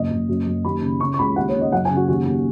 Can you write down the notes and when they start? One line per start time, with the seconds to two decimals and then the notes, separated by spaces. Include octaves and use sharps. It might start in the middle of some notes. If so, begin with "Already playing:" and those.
Already playing: F#1 D#5
0.10 F#1
0.29 F#2
0.47 F#2
0.65 D#2 B5
0.82 C#3
1.00 C#3 C#6
1.14 C#6
1.19 C#2 B5
1.36 D#2 F#5
1.49 C#5
1.54 C#3
1.61 D#5
1.72 F#2 F#5
1.85 G#5
1.90 C#3
1.96 F#4
2.08 D#2 F#4
2.26 D#2